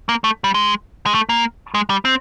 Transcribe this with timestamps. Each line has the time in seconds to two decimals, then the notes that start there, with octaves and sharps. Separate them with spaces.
0.09 A#3
0.24 A3
0.44 G3
0.54 G#3
1.06 G#3
1.15 A3
1.29 A#3
1.74 G#3
1.90 G3
2.05 C4